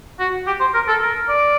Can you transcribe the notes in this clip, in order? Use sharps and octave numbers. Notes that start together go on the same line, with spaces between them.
F#4
G4
C5
A#4
A4
A#4
D5